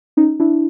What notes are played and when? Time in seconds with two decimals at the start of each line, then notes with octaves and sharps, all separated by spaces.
0.17 C#4 D#4
0.40 D4 E4